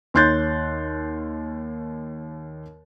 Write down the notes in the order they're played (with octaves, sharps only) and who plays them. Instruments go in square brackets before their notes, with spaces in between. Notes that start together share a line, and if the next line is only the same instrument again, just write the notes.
[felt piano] D#2 C#5 C6 F#6 G6 A6